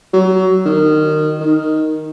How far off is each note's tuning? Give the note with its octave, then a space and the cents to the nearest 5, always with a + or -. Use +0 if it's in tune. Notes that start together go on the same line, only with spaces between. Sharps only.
F#3 +25
D#3 -20
D#3 +0